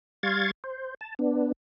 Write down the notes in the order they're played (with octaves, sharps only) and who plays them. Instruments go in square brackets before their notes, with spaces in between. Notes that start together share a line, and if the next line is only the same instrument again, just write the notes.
[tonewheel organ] G3 F5 C6 C#6 G#6 A6
C5
A5
B3 D4